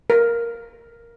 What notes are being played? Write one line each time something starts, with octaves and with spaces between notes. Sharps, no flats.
A#4